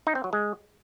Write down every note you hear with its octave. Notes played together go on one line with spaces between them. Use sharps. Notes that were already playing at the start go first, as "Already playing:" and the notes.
D#4
C4
F#3
G#3